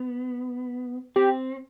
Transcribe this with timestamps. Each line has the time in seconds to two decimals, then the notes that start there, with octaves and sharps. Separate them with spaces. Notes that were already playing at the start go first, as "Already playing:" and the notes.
Already playing: B3
1.16 C4 G4